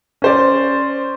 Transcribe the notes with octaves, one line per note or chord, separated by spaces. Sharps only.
C#4 C5 D5